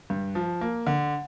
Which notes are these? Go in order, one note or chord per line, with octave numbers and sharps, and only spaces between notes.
G2
F3
A#3
D3